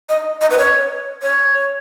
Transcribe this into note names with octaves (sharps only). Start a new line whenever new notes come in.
D#5
D#5
B4
C#5
C#5